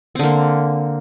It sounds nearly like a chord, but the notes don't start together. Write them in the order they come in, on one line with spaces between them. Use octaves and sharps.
C4 D3 A#3